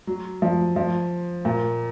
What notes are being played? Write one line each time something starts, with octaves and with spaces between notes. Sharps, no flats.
F#3
F3
F3
A#2